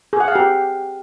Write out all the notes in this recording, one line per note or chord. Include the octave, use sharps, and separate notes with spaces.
G#4
F#5
F5
G4